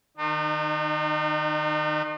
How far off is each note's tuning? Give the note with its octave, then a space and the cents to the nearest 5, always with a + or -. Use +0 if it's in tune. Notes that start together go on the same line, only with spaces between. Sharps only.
D#3 -20 D#4 -45